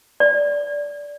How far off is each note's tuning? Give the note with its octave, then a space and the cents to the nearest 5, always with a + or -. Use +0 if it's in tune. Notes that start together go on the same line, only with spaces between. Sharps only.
D5 -15